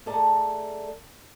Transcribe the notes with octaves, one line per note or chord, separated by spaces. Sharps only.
A3 G#4 A4 D5 A#5